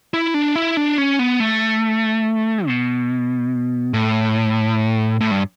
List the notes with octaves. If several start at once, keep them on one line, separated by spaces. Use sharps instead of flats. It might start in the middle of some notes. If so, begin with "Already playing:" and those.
E4
D4
E4
D4
C#4
B3
A3
B2
A2
A2
G2